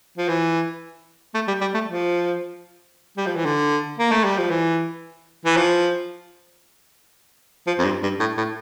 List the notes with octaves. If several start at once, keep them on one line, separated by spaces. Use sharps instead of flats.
F3
E3
A3
G3
G3
A3
F3
G3
F3
E3
D3
A#3
A3
G3
F3
E3
E3
F3
F3
F2
G2
G2
A2
A2